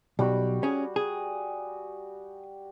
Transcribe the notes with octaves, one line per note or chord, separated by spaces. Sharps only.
B1 G3 F#4
C#4 G#4
G#4